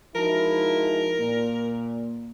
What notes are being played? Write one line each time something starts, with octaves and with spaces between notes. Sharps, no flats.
F3 G#3 D#4 E4 F#4 A#4 A5
A#2 A#3